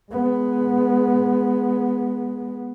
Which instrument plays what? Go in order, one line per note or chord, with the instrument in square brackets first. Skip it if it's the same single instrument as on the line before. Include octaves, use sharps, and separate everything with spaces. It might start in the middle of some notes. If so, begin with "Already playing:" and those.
[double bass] G#3 B3